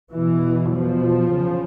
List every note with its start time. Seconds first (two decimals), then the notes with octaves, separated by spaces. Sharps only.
0.12 E2 B2 E3
0.73 F3
1.35 C#3